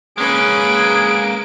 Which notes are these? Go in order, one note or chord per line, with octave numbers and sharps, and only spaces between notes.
G#3 A#3 C#4 G#4 B4 D7